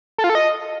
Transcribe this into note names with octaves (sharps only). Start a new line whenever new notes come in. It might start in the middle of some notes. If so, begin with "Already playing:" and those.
A4
F4
A4
D#5